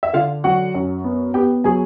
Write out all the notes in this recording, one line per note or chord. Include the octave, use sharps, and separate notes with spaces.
E5
D3 F4 F5
F#3 F#4 F#5
F#2
B3
B3 G4 G5
F#3 G#4 G#5